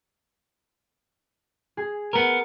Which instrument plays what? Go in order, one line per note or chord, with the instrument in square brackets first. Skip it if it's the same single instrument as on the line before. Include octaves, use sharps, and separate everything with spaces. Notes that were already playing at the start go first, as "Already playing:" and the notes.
[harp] G#4
[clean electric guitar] B3 A#4